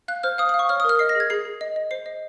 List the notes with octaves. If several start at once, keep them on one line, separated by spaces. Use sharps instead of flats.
F5 F#6
C5 F6
F5 D#6
D#6
F5
C#6
C#5 F6
D#6
A#4 F6
D#5 C7
A#6
G#4 G#6
G#4 C7
G#4
D#5
D#5
C5 C7
D#5